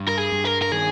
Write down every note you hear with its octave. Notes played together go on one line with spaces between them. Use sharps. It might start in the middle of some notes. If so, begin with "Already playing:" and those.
Already playing: G2
A#4
G#4
G2
A#4
A#4
D#3 G#4